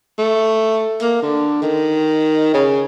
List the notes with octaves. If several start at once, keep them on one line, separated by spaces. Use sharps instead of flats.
A3
A#3
D3
D#3
C#3